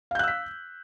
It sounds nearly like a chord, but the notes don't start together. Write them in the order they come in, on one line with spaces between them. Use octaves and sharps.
F5 G6 F#6 E6 B6